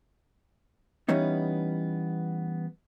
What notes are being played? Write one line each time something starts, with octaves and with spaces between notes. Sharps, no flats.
E3 G3 B3 C#4 D#4